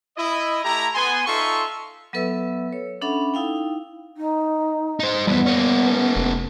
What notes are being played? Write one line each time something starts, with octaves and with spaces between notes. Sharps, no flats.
E4 D#5
A3 E4 G4 A#5
B3 G#5 C6
D#4 F4 A4 E5 C6 C#6
F#3 B3 A4 B4 E5 E6
C#5
C#4 D4 A4 E5 F#5 B5
D#4 E4 F5 G5
D#4
D#4 C5
F2 E3 G3 B3
A#3 C#4
F1